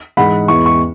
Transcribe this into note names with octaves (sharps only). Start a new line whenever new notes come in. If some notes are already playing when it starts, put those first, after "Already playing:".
G#2 E3 G#3 F#5 B5
E2 E3 G#3 E4 C#6
C#6